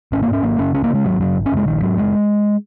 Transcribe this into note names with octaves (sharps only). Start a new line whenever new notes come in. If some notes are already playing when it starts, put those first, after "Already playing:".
G#1 C#4
A#3
G#2
C#4
G#1 A#3
F#2 C#3 C#4
C#2 C#4
A#3
C#3 G#3
G#1 F#3
F#2 C#3 F#3
G#1
C#4
F#2 C#3 G#3
A#1 D#3
G#2 F#3
F#1 G#3